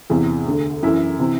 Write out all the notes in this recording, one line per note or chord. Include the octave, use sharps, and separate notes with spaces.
E2 C3 E3
D2 D3
F#2 E3 E4
C3 E3